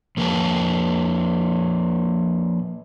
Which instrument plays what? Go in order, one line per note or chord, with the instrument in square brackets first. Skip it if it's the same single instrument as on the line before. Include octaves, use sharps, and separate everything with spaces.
[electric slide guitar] F3 A#3 B4 D#5 A5